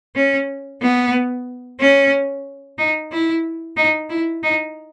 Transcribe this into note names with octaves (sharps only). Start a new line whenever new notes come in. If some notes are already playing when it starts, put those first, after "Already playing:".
C#4
B3
C#4
D#4
E4
D#4
E4
D#4